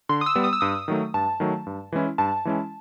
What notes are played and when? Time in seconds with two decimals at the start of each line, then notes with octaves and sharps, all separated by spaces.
0.09 D3 C6
0.21 D#6
0.26 E6
0.35 G3 B3
0.44 D#6
0.53 E6
0.61 G2 D#6
0.88 D#3 F#3 A3
1.14 G2 A5
1.40 D#3 F#3 A3
1.67 G2
1.92 E3 G#3 C#4 E4
2.18 G2 A5
2.45 E3 G#3 C#4 E4